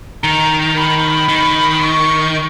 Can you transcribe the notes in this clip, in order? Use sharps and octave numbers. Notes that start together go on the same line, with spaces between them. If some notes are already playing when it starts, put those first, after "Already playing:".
D#3 A#5
B5
D#3
C#6